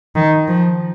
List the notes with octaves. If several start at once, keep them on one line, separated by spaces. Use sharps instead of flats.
D#3
F3